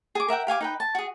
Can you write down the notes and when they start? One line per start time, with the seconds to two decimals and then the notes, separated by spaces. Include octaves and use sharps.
0.15 G#4 D6
0.28 A#4 E5 F#5 G5
0.47 G4 F5 G#5 D6
0.61 D#4 B4 G5
0.80 A5
0.95 F#4 G#4